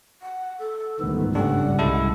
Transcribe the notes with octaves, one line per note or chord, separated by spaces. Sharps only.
F#5
A4
G1 D2 G#2 D#3 A3 B3
G2 C#3 G3 D4 A4 F#5
C2 G#3 E4 A4